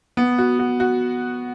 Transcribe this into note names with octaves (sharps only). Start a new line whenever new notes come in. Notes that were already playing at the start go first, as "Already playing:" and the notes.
B3
F#4
F#4
F#4